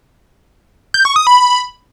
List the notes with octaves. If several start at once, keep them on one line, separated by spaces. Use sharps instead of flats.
G6
C#6
D#6
B5